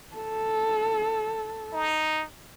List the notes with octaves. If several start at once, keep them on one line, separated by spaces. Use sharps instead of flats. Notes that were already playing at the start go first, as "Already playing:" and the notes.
A4
D#4